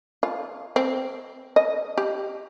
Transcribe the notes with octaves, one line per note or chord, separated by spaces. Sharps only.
F4
C4
D#5
G4